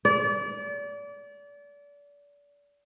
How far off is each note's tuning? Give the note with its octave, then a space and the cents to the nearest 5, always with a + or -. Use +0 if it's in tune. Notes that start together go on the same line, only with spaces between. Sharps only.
D5 -30